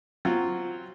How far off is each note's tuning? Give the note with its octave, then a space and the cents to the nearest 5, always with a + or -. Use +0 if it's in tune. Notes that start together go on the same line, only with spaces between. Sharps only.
F#3 +0 C4 +0 F4 +0